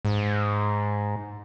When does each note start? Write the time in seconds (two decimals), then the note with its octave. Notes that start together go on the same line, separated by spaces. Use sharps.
0.05 G#2